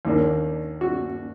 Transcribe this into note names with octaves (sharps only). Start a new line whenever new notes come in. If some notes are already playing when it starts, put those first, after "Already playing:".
D#2 D#3 A#3 D4
F#4